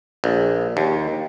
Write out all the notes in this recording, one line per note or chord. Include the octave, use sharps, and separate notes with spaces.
A#1
D#2